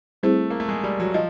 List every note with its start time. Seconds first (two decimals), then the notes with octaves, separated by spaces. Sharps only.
0.23 G3 A3 C4 E4 G#4 C5
0.50 A#3
0.60 A3
0.69 G#3
0.84 G3
1.00 F#3
1.14 F3 D#5